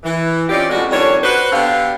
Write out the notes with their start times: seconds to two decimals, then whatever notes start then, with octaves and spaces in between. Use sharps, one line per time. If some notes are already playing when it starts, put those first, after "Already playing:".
0.03 E3
0.49 C4 C#4 D#4 F4 G4 D5
0.70 F2 A2 G#3 C#4 F#4
0.91 F2 D#3 G3 D4 C#5
1.22 F#4 B4 C5
1.51 D3 B3 G4 F5